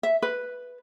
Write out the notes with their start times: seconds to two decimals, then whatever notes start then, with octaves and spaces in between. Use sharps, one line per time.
0.03 E5
0.22 B4